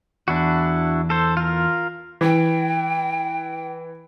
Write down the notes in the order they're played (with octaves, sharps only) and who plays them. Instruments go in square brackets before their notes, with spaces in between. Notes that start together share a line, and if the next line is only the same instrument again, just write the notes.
[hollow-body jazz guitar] E2 [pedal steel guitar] D4 E4 F#4
[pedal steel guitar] A4 C5
F4 A#4
[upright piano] E3 [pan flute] G5